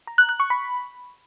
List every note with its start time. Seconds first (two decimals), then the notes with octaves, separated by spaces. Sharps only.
0.07 A#5
0.18 F#6
0.29 F#6
0.40 C#6
0.50 B5